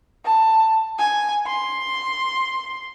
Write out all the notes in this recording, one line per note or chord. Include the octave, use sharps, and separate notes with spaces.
A5
G#5
C6